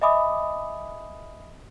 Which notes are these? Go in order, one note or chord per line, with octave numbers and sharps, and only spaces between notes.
D#5 E5 G#5 B5 D6 D#6